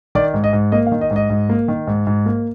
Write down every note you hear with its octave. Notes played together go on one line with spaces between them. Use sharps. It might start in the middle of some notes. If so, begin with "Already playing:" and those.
D#3 D5
G#2
D#5
G#2
A#3 D#5
F5
D#3
D#5
G#2
D#5
G#2
A#3
D#3
G#2
G#2
A#3